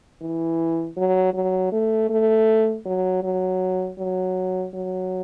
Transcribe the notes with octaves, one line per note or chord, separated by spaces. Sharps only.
E3
F#3
F#3
A3
A3
F#3
F#3
F#3
F#3